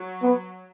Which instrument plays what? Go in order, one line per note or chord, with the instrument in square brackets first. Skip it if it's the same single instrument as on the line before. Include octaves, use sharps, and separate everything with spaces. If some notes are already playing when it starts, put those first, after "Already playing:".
Already playing: [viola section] F#3
[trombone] B3